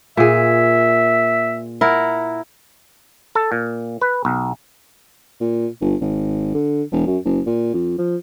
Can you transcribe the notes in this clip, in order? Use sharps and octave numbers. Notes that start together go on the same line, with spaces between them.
A#2 G#4 E5
E4 A#4 F#5
A4
A#2
B4
B1
A#2
G1
G#1
D3
E1
F#2
F#1
A#2
F2
F3